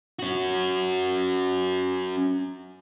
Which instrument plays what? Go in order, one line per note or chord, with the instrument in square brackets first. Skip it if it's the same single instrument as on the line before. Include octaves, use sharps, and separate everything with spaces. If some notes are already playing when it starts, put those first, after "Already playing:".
[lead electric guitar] C#4 F#4